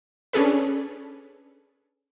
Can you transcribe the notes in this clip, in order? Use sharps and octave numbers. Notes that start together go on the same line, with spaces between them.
C#4 D4 G#4 A4 B4